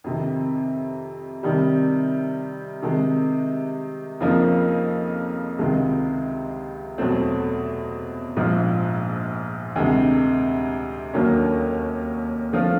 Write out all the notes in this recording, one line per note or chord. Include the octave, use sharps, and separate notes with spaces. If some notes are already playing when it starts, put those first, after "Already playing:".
F2 C3 D#3
C3 D#3 G3
C3 D#3 G#3
F2 C#3 F3 A#3 D#4
C#2 C3 D#3 G#3
E2 B2 F#3 A3 C4
A#1 G#2 F3
D2 C3 D#3 G#3
D#2 D3 F#3 A#3 C#4
D3 F3 A3 C4 F4